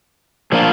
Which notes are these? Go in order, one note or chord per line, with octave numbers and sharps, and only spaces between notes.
A#2 F3 A#3 D4 F4